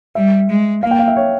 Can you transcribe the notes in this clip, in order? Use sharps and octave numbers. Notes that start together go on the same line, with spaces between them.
G3 E5
G#3
A#3 F5
G5
F5
E5
C#5